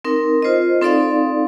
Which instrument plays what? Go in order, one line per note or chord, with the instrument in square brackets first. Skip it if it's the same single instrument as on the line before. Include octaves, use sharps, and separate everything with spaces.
[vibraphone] C4 D#4 A#4
F4 C5 D#5
C4 D#4 A4 D5 F5